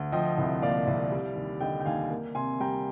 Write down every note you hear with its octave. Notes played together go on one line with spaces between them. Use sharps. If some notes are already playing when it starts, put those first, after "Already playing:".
Already playing: D2
F3 D#5 G5
C2
A#2 D5 F5
C2
G3
D#2
D3 D#5 G5
G5
D#2 F5 G#5
A#3
C3 G#5 C6
G3 G5 A#5